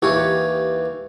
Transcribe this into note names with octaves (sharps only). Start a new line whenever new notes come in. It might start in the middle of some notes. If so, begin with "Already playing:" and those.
D#2 E3 G4 C#5